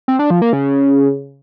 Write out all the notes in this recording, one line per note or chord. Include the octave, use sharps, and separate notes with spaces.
C4
D4
F3
A#3
C#3